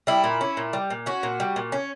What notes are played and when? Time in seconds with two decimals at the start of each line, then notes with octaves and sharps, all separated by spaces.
0.07 G3 E4
0.24 A#2
0.41 C#4
0.57 A#2
0.73 G3
0.90 A#2
1.06 C#4 F#4
1.23 A#2
1.40 G3
1.56 A#2
1.72 C#4